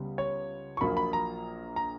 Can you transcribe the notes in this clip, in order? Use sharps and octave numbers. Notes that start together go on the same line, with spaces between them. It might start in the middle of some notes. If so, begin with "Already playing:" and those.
Already playing: C#2 C#3 G3 B3
C#5
C#6
A#1 A#2 F#3 A#3 B5
B5
A#5
A#5